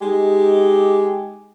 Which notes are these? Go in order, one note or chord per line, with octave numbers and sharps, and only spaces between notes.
G#3 D#4 G4